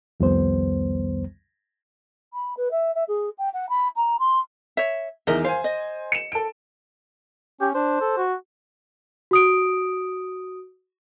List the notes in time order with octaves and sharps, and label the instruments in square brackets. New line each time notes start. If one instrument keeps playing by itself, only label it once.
[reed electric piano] C2 F2 D#3 G3 B3 C5
[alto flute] B5
B4
E5
E5
G#4
G5
F#5
B5
A#5
C6
[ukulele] C#5 E5
[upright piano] E2 D#3 E3 [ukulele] A#4 D#5 E5
[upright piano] C5 G#5 [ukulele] F5
[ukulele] D#5
[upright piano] C#7 E7
A4 D7
[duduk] C#4 [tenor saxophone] G4
[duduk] D4 [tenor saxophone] C5
[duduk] A4
F#4
[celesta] F#4 D#6 D7